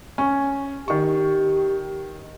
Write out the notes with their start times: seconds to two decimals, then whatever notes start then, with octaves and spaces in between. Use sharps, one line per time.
0.18 C#4
0.88 D#3 G4 C#6